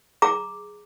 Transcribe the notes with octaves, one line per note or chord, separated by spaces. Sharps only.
G#4 A#5 D6